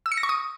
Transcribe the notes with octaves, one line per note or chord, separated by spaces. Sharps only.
E6
C#7
A#6
C#6
D#6